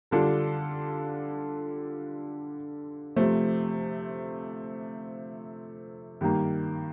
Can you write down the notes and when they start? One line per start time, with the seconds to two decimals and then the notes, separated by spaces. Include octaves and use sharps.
0.11 D3 G3 D4 F4 A4
3.16 C3 F3 A3
6.21 G2 D#3 A#3